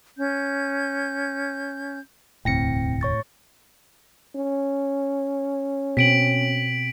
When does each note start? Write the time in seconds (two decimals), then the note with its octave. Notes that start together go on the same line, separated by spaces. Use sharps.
0.17 C#4 G6
2.45 E1 D2 A2 C4 G5 A#6 C#7
3.01 C#5 C#6 A6
4.35 C#4
5.97 B2 C4 B6 D7 F#7